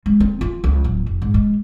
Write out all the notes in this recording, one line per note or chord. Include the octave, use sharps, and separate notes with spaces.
G#3
C4
F4
C#2
D1
F1
G#2
G#3